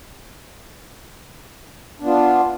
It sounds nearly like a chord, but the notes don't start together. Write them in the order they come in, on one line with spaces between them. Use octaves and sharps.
D4 B3 F4